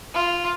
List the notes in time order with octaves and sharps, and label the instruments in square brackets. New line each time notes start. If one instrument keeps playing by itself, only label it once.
[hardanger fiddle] F4